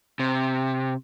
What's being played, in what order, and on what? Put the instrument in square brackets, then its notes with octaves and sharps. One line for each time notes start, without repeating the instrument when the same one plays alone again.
[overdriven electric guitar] C3